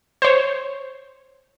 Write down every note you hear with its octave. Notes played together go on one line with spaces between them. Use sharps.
C5 C#5